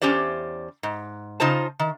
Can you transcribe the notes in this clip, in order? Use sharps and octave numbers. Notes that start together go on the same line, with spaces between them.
E2 C#4 G4 C5 D5
G#2
C#3 D#4 F4 C5 A5
D#3